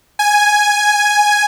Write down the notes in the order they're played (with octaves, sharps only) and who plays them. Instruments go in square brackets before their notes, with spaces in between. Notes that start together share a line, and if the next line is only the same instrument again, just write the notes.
[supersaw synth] G#5